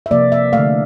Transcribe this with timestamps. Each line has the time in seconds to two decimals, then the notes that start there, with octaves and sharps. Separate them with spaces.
0.06 E5
0.11 C3 F3 A#3 D5
0.32 E5
0.53 A3 F5
0.58 D3